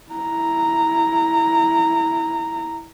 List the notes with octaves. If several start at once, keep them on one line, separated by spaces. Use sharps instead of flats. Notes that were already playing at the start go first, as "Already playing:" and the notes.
E4 A#5